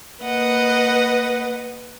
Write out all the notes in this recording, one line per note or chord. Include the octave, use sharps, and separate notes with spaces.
A#3 B4 D#5 F#5